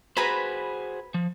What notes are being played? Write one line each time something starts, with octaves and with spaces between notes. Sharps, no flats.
F#4 G#4 B4 C5 A#5 B5
F3